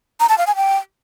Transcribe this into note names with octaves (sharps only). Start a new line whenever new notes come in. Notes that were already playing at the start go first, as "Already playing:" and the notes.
A#5
A5
F5
G#5
G5